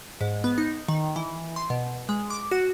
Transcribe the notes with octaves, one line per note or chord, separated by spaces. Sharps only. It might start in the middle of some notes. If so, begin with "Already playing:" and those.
G#2
B3
D#4
D#3
E3
C6
B2
G#3
D6
F#4